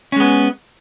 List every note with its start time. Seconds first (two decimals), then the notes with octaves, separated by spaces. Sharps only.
0.12 C#4
0.16 G#3
0.20 B3